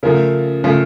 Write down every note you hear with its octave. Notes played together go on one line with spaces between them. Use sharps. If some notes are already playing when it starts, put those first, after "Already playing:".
C#3 F3 A3 A#4
C#3 F3 A3